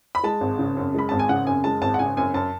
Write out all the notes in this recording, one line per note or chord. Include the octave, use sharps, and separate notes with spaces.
B5
G#3 A5
G#1
C#3
F#2
G#3 B5
G#1 A5
G#5
C#3 F#5
F#2 G#5
G#3 A5
G#1 A5
F#5
C#3 G#5
F#2 G#5
F#2 A5